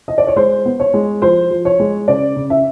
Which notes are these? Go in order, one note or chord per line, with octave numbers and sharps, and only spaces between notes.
D#5
D5
C#5
G#3 C5
B3
C#5
G#3
F3 C5
F3
C#5
G#3
C#3 D5
C#3
E5